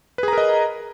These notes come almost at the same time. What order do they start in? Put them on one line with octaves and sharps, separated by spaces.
B4 G#4 A#5 A#4 D#5